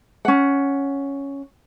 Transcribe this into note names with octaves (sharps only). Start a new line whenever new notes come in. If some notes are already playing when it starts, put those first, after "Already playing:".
C#4 F#5